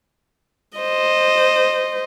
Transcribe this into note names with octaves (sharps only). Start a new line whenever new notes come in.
C5 D#5